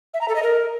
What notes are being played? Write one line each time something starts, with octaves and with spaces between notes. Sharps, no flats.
E5
A#5
A4
D#5
A#4